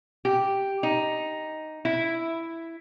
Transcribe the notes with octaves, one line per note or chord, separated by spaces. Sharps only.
G4
D#4
E4